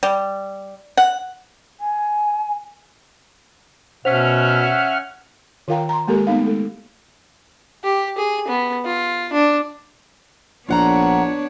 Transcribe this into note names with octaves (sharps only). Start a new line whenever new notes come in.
G3
F#5
G#5
B2 C#4 C5 E5 F#5 F6 B6
D#3 F4 A#4 F5 G5 A#5
A#5 C6
G#3 A#3 G4 A4 A#4
A3 B3 D#4 F5
G#3 A4
G4
G#4
B3
F4
D4
A#1 B3 D4 F4 C#5 F#5 A#5